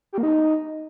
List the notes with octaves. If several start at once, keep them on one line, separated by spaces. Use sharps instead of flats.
G4
A#3
D#4